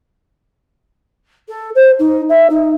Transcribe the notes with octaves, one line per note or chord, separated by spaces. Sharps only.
A4
C5
D#4
E5
D#4